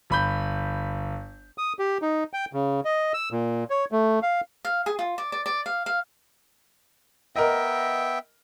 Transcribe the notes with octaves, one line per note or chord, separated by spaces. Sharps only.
G1 B5 G6
D#6
G4
D#4
G5
C#3
D#5
E6
A#2
C#5
A3
F5
F5
G#4
F4
D5
D5
D5
F5
F5
B3 A#4 D#5 E5 G5